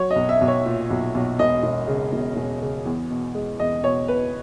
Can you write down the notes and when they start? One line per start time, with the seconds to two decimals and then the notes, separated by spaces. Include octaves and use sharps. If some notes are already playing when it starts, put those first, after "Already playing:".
Already playing: F#3 C#5
0.11 D#5
0.16 B1
0.29 E5
0.41 B1
0.48 C#5
0.66 A#2
0.91 B1
1.15 B1
1.39 E1 D#5
1.63 E1
1.87 C#3
2.13 E1
2.36 E1
2.62 C#3
2.86 E2
3.10 B2
3.35 G#3
3.60 E2 D#5
3.83 B2 C#5
4.08 B2 B4